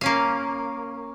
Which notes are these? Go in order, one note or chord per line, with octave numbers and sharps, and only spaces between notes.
A#3 C#4 F5